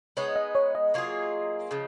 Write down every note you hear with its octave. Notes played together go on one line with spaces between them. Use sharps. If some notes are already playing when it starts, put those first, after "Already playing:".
G#3 B3 D#4 C#5
D#5
C#5
D#5
F#3 A#3 F4 G#4
C#3 F3